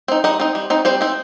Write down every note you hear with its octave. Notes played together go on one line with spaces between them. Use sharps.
C4 D#4
G3 D#4 D#5
C4 D#4
G3
C4 D#4
G3 C4 C5
C4 D#4